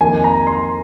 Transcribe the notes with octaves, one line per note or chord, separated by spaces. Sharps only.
F2 D#3 A#3 D#4 G#5
A#5
C6